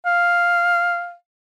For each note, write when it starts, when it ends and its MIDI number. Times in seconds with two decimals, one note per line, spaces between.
0.06 1.13 77